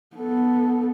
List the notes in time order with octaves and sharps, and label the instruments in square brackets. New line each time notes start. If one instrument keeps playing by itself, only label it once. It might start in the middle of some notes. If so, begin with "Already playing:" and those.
[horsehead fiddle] B3 A4